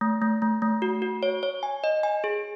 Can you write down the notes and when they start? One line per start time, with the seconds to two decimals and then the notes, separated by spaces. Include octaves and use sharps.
0.01 A3
0.22 A3
0.42 A3
0.62 A3
0.82 F#4
1.02 F#4
1.23 C#5
1.43 C#5
1.63 G#5
1.84 D#5
2.03 G#5
2.24 G#4